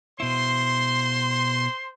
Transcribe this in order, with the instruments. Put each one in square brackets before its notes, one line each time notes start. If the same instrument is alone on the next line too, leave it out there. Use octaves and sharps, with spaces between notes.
[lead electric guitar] B2 E4 [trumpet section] C5 C6